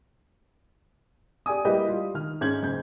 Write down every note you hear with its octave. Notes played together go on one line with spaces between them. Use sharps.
G4 D5 G#5 D#6
G3 A#3 E4 G4 B4 D#5
G3 F4
D#3 F6
G#2 C#4 G6 G#6 F#7
F#1 G6